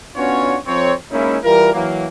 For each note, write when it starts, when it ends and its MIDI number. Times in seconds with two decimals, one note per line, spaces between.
0.16 0.58 59
0.16 0.58 61
0.16 0.58 62
0.16 0.58 65
0.16 0.58 66
0.16 0.58 73
0.67 0.94 41
0.67 0.94 60
0.67 0.94 73
1.11 1.37 56
1.11 1.37 58
1.11 1.37 61
1.11 1.37 63
1.11 1.37 64
1.44 1.71 52
1.44 1.71 55
1.44 1.71 65
1.44 1.71 70
1.74 2.06 52
1.74 2.06 54
1.74 2.06 58